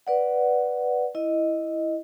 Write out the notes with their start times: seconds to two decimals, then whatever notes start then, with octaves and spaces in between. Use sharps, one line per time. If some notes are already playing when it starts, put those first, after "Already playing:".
0.07 B4 D5 F#5
1.15 E4 D#5